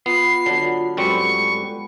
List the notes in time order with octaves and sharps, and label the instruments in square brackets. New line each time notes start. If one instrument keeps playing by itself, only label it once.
[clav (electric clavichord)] B3 [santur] F4 B5 [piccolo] C7
[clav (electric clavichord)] D3 [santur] F#3 B3 D4 [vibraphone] F4
[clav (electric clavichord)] F#2 G3 C4 [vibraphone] G#3 A4 [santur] G4 B4 [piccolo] C#6